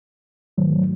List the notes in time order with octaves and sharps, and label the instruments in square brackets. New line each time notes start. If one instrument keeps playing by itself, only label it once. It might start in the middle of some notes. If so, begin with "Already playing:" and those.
[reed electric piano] G#2 D#3 F#3 A3